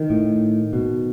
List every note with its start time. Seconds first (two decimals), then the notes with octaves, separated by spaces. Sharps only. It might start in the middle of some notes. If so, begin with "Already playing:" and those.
Already playing: D#3
0.10 A2
0.73 B2